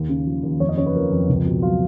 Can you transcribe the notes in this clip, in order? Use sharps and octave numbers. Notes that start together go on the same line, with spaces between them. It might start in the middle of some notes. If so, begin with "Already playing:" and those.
Already playing: D#2
C#3
F3
D#2
F2 C#5
D#5
C#3 C#5
B4
F3 A#4
F2
C#2
B2
F#3 F4